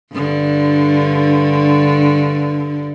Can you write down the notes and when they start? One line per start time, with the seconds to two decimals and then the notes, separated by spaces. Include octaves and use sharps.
0.12 G2 D3